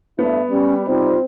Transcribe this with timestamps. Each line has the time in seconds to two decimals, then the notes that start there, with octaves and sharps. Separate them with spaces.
0.19 G2 A3 B3 E4
0.50 G3 C#4 G4
0.87 C3 G3 C4 D#4 F4